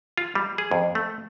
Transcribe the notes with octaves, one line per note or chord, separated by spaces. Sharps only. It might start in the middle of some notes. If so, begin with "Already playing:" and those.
F4
G3
G#4
F2
A3